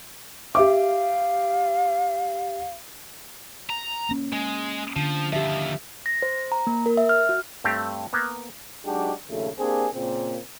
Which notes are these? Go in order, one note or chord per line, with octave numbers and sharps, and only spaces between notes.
G4 E5 F5 D6
A#5
A#3 C#4
G#3
D3 F3 D4
D#2 F3 G4 E5
A#6
C5
A#5
A#3
A#4
E5
F6
F#4
G2 A3 C4 G4
A#3 B3
F#3 G#3 D4 D#4 F#4 G4
A#1 D#2 A#2 C#3 A3
A#3 C4 D4 G4 G#4
A#2 C#3 A#3 C4